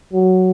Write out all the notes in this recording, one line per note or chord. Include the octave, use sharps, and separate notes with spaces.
F#3